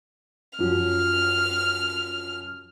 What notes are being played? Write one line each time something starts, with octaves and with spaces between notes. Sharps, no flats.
F#2 F3 F#3 F6